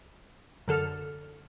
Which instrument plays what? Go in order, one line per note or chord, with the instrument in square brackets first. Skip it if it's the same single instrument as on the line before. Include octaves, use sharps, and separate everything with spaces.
[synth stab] F#2 D3 A4 F6